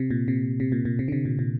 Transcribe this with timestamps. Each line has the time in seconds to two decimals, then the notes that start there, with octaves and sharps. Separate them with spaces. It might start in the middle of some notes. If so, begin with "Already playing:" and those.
Already playing: C3
0.11 A#2
0.28 C3
0.60 C3
0.72 A#2
0.85 A#2
0.99 C3
1.08 D3
1.12 C3
1.25 A#2
1.39 A#2